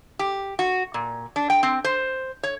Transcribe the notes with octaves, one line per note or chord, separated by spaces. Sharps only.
G4
F#4
A#2
D4
G5
C4
C5
C#5